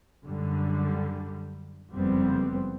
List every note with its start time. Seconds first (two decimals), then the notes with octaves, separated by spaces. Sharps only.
0.24 F#2 D3 G3
1.93 F#1 F2 G3 B3 C4